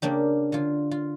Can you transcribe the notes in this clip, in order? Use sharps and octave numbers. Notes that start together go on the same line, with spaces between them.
C#3 A#3 D4 G4
D3 F4
F4